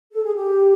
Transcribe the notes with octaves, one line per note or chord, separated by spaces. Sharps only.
A4
G#4
G4